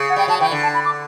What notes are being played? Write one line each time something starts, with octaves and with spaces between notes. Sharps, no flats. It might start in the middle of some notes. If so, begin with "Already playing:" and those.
Already playing: C#3
F#5
G3 G5
F#3 A5
E3 G5
D3
A5
B5
D6